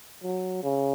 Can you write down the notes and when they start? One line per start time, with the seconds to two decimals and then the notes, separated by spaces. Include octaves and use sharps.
0.23 F#3
0.63 C#3